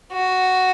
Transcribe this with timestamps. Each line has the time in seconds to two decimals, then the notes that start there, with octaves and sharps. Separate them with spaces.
0.12 F#4